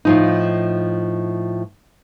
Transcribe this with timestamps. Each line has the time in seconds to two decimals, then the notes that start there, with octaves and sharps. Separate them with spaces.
0.05 A2 F3 D#4